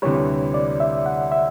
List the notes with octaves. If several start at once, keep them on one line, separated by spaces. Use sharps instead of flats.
D2 C3 E3 G3 C#5
D5
E5
F#5
E5